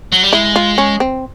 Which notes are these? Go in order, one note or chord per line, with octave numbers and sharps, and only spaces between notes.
F#3
G3
G#3 E4
F4
C#4
C4